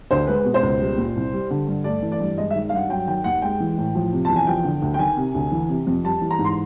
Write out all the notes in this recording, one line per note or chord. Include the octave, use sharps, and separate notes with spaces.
D2 C5
G#3 B4
B2
C5
C#2
G3
A#2
C2
G3
D3
G2
A3 D5
E3
D5
G2
G#3 D#5
E5
D#3
F5
G2 F#5
F#3 G5
D#3 G5
D#2 F#5
G#3 G5
E3
A2
F3
C3
E2 A5
G#5
F3 G5
D3
D2
G5
D#3 G#5
C3
D2
E3
C3
F2
G3 A5
E3
A#5
G#2
C6